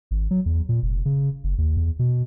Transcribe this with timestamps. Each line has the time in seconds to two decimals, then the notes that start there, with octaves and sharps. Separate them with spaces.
0.11 G#1
0.31 F#3
0.46 E2
0.69 A#2
0.83 F1
1.05 C#3
1.44 F#1
1.58 D#2
1.77 E2
1.99 B2